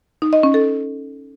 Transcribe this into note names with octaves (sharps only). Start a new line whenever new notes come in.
D#4
D#5
C#4
A4